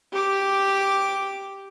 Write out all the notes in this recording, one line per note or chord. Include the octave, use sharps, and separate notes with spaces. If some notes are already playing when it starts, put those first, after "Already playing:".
G4 D6